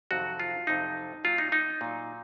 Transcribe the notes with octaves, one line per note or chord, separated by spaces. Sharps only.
F2 C3 D#3 F#3 F#4
F4
F2 C3 F#3 D#4
A#2 F#3 F4
D#4
D#4
A#2 F#3